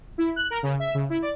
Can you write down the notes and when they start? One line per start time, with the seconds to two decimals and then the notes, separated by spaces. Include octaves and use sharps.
0.18 E4
0.36 F#6
0.50 A#4
0.63 C#3
0.79 E5
0.95 C#3
1.10 E4
1.22 D5